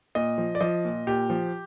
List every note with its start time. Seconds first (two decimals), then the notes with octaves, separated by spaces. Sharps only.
0.15 A#2 D#5
0.38 F3
0.55 D5
0.61 F3 D#5
0.85 A#2
1.07 A#2 G4
1.30 F3